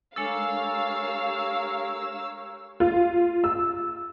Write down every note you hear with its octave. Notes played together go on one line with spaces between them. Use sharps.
G#3 D4 G4 A4 A#4 C#5 F5 E6
F4
E6